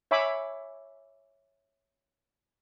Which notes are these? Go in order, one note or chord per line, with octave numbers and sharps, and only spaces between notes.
C#5 E5 G#5 B5 D6